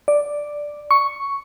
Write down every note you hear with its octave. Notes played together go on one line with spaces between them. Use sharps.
D5
C#6